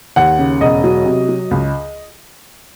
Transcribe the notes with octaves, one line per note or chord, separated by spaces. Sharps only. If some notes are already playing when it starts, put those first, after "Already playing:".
D#2 F#5
C#3
E1 D#5
F#3
C3
F#3
C#2